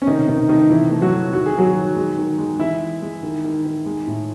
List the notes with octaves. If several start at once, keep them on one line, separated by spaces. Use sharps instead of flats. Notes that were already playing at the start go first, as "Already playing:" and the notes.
C#4
C3 D#3 D#4
C3 D#3 D#4
D#3 A3 D#4
C3 E3 E4
A3
F#3 F#4
E3
D#3 F#4
G#4
D#3 F#3 F#4
D#3
G#3
D#3
G#3
E3 E4 E5
E3
G#3
D#3
D#3
D#3
G#3
A2